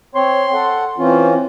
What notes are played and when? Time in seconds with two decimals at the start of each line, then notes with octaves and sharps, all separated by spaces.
0.15 C4 C#5 C6
0.53 A4 F#5
0.98 E3 C4 C#4 F4